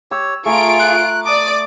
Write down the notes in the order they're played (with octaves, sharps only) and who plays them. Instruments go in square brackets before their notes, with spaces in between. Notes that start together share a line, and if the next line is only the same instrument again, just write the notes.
[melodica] G4 C#5 [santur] E6
[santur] A3 A#5 [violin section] F4 D7 [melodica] G#4 C#6
[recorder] F#6
[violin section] D5 D6 [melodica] A5 [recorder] D#6